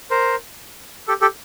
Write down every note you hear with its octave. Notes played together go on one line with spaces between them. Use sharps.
A#4 C5
G4 A4
G4 A4